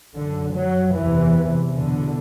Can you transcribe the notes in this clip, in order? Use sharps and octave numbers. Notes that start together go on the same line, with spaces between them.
F#2 D3
F#3
E2 C3 E3
E2 B2 D3